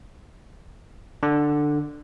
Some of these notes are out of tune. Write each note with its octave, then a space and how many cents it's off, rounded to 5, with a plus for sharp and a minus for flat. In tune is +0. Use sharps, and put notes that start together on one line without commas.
D3 +10